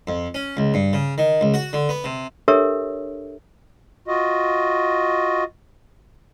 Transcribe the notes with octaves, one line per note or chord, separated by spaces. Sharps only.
F2
C#4
C#2
G2
C#3
D#3
C#2
F#4
D3
B3
C3
D4 G4 A4 A#4 C#5 E5
F4 F#4 D#5